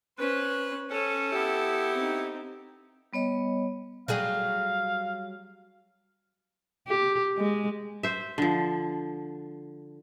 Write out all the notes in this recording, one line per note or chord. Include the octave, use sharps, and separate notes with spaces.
C#4 B4 C5
C#4 A4
B3 E4 G4
C4 D#4
G3 B3 C#5 D#5
F#3 G3 G#4 F5
G4
G#3
C5 E5
D3 F3